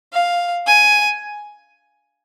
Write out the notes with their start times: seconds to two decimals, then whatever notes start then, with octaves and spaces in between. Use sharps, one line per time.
0.13 F5
0.66 G#5